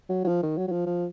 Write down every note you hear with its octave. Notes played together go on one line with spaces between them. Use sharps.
F#3
F#3
F3
D#3
F#3
F#3
F3
F3